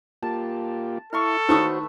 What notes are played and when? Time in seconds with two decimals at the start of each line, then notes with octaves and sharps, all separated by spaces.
0.23 A#3 F4 G4 A5
1.13 E4 A4 F5 C6 C#6
1.49 D#3 A3 F#4 B4 C5 C#6 D#6 E6